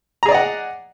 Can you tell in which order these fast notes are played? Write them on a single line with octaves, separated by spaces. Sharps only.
A#5 G#4 D5 D#5 F#5